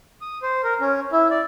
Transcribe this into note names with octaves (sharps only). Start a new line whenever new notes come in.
D#6
C5
A#4
C#4
E4
D5